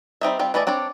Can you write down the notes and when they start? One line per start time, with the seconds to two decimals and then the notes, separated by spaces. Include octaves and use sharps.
0.21 G3 C4 D#4 E5
0.39 G3 C4 F4
0.54 E3 A3 E4 D5 D#5
0.67 C4 D4 C#5 D5